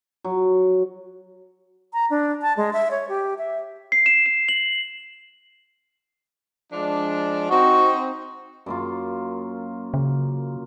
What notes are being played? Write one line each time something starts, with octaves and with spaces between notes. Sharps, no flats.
F#3
A#5
D4
A5
G#3
E5
C#5
G4
E5
C7
E7
E7
F#7
F3 G#3 D4
C4 D#4 F#4
F#2 A#3 F4
C#3